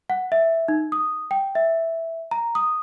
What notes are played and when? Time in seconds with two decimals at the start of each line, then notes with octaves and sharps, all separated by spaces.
0.10 F#5
0.32 E5
0.68 D#4
0.92 D#6
1.31 G5
1.55 E5
2.31 A#5
2.55 D#6